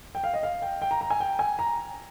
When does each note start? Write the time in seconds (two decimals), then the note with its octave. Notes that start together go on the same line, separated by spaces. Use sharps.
0.15 G5
0.24 F5
0.34 D#5
0.43 F5
0.62 G5
0.82 G5
0.91 A#5
1.01 A#5
1.10 G#5
1.20 G5
1.39 G#5
1.59 A#5